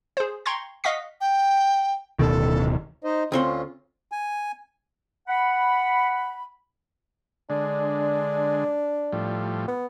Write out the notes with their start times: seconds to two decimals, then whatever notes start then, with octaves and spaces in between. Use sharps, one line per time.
0.17 G#4 C5
0.46 G5 A#5 C6 C#6 G#6
0.84 D#5 F5 F#5 C#6 B6
1.21 G5
2.19 D1 B2 D#3 A4
3.04 D#4 C5 D#5
3.32 D2 C4 C#4 F4 C6
4.12 G#5
5.28 F#5 B5
7.50 D3 G#3 D4
9.13 A2 F3 G3
9.68 B3